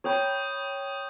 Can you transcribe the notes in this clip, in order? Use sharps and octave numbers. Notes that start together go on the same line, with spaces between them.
C#5 G5 B5 C#6 D#6 G6